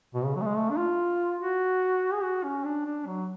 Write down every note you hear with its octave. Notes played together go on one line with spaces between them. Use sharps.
B2
C#3
F#3
A3
G#3
A3
D4
F4
F#4
G#4
F#4
C#4
D4
D4
F#3